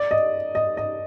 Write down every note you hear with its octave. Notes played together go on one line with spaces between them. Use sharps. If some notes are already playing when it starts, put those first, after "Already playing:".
Already playing: D5
D#5
D#5
D#5